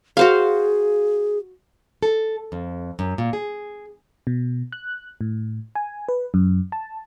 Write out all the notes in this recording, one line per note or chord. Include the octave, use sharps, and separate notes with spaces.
F#4 G#4 C5 F5
A4
F2
F#2
A#2
G#4
B2
F#6
A2
G#5
B4
F#2
A5